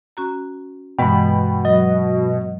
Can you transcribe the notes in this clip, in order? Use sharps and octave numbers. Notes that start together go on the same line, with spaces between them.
C#4 F#4 A#5
G2 B2 E3 G#3 G5 B5
F#3 D#5